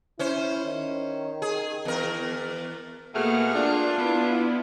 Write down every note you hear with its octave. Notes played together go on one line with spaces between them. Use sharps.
C#4 E4 C5
D#3
G#4
E2 A#4
B2 A3 A#3 G#4 F#5 F6
D4 F4
B3 E4